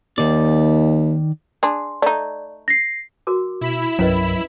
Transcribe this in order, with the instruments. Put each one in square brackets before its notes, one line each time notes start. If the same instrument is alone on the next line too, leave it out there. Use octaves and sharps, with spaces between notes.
[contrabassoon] D#2 [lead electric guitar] D#3 D5
[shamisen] D4 G#4 [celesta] C6
[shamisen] A3 D#4 [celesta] D5
[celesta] A#6 C7
[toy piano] F#4 A#4 D6
[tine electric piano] B2 [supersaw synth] E4 B5 E7
[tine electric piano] C2 G2 A#4 [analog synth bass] F#3 [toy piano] C#4 B4 D#5